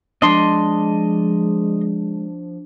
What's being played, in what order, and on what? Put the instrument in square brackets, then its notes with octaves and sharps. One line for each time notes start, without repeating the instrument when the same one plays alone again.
[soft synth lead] F3 [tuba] G#3 [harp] D4 [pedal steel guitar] D#5 C6